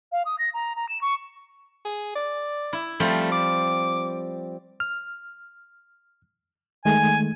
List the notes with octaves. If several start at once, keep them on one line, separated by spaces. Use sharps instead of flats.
F5
D#6
A#6
A#5
A#5
E7
C#6
G#4
D5
E4
F3 G3 A3 C4
D6
F6
D#3 G#3 A3 G#5